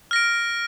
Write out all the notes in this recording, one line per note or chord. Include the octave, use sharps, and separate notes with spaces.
F6 A#6 D7